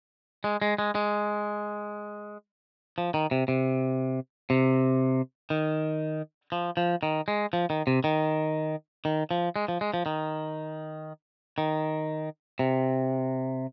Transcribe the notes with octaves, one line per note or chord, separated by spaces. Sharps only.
G#3
G#3
G#3
G#3
F3
D#3
C3
C3
C3
D#3
F3
F3
D#3
G#3
F3
D#3
C3
D#3
D#3
F3
G#3
F3
G#3
F3
D#3
D#3
C3